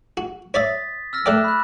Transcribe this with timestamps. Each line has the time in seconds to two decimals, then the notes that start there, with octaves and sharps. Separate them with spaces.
0.17 F#4
0.54 C#5 D5 E5 D#6 A6 B6
1.13 E6 F6 A#6
1.26 A3 D5 G5 D6 F#6 E7
1.44 B5 F#6